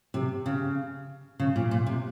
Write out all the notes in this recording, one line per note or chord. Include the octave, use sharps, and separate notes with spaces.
C3
C#3
C#3
A#2
A#2
C3